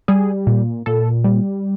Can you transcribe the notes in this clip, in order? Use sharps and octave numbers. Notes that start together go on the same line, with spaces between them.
G3 G#4
A#2
A#2 A4
G3